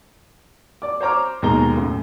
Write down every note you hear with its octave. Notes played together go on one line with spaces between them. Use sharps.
D5 D6
C5 C#5 A#5 D6 F6
D#2 B2 G#3 A#4 A#5 G7
F#2 A2